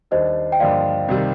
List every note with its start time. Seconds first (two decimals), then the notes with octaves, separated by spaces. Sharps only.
0.11 D#2 D#3 G3 D4 C5 D#5
0.52 G5
0.60 G2 D3 F3 A#3 F4 D5 F5
1.08 C2 C3 D#3 G3